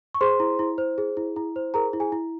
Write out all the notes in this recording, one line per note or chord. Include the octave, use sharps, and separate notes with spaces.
C#6
G#4 C5 C6
E4
E4
C5
G#4
E4
E4
C5
G#4 A#4 A#5
E4
G#4 G#5
E4